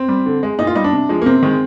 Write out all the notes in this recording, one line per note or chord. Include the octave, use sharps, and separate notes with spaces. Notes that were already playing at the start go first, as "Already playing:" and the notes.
Already playing: C4
G3
D3
G#3
A#2 D#4
F4
G3 D#4
D4
C3
F3 G#3
A#3
C3 C4
D#3 G#3